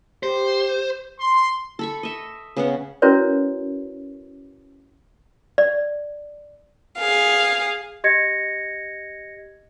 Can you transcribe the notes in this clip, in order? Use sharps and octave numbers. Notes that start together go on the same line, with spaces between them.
G4 C5
C6
A4 B5 C#6
D#5 E5
C#3 B3 F#5
C#4 E4 F#4 A#4 B4 C#5
D5
G#4 F5
G4 D#5 G#6 A#6 C#7